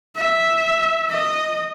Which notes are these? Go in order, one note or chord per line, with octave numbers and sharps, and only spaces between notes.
E5
D#5